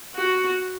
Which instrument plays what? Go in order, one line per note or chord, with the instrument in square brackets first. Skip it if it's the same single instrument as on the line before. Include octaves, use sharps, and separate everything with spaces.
[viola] F#4